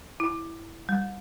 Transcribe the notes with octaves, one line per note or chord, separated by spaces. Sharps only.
E4
G3